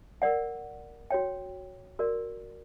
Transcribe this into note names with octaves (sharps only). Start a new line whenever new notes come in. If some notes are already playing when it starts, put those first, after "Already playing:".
A#4 D5 F#5
F#4 C#5 G5
F#4 A#4 D5